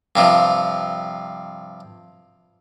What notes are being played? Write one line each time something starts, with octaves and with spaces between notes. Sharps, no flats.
G2 C3 F3